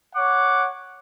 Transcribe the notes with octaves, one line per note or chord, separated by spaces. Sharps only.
C#5 F#5 D6